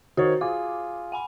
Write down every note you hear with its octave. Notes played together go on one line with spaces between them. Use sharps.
D#3 F#4 C5 C#5
F4 G#4 D6
F#5 G#5 B5